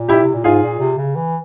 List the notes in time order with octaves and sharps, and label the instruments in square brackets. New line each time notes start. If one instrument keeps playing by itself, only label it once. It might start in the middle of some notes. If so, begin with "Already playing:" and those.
Already playing: [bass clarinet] A#2
[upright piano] E4 G4
[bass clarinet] C3
A#2
[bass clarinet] G#2 [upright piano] F4 G#4
[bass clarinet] A#2
C3
C#3
E3